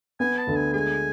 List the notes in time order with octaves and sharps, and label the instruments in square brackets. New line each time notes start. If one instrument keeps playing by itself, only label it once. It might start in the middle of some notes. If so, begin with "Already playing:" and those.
[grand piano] B3 [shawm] G#5
[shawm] A5
[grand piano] D2
[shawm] G#5
[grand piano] G#3 [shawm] G#5